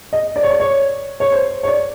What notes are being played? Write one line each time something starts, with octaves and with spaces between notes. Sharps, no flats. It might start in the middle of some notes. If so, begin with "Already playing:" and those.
D#5
D5
C#5
D5
C#5
C#5
C5
C#5
D5